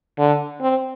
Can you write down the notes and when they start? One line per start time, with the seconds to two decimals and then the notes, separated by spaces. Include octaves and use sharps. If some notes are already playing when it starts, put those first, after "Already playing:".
0.18 D3
0.61 C4